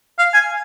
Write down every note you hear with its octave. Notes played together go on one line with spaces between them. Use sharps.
F5
G#5